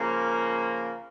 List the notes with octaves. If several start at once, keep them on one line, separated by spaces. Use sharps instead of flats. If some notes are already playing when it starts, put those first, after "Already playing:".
Already playing: C#3 F3 A#3